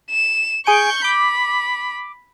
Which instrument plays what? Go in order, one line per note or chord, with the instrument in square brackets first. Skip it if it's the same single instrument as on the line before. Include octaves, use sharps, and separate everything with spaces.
[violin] E7
[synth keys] G#4 G#5 D7 [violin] C#6 G6
[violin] B5 [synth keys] D6